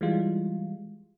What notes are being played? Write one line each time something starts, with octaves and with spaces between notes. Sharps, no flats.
E3 G3 G#3 F4